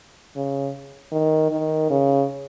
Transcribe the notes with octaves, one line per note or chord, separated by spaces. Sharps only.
C#3
D#3
D#3
C#3